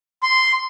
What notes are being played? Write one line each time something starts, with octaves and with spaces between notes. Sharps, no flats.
C6